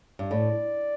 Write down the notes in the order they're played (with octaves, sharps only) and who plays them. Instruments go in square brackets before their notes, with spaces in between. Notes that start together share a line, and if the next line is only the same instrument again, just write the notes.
[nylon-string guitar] G2
[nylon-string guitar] A2 [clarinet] D5